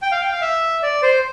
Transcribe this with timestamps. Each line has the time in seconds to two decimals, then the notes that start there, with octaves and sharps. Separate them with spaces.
0.02 G5
0.12 F5
0.21 G5
0.32 F5
0.41 E5
0.83 D5
1.03 C5